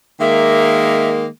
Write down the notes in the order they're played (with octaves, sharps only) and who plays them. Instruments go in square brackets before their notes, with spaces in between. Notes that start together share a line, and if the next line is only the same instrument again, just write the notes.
[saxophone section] D#3 G#3 A#3 [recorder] E5